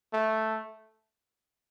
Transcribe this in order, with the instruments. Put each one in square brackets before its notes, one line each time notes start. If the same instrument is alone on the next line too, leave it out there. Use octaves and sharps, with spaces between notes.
[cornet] A3